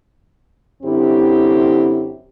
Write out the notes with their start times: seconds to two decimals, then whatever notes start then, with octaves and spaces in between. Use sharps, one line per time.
0.83 F#2 D3 C4 E4 G4